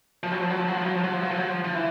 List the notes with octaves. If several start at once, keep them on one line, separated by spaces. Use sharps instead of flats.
F3
F#3
F3
F#3
F3
F#3
F3
F#3
F3
F#3
F3
F#3
F3
F#3
F3
F3
E3